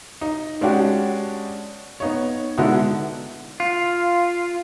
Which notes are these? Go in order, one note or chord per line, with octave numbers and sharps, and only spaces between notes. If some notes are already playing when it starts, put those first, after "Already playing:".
D#4
G#3 C#4 D4 F#4 G4
B3 D#4 C#5
D3 G#3 B3 D#4 E4 F#4
F4